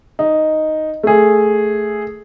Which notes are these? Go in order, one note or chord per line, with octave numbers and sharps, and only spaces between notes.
D#4
A3 G#4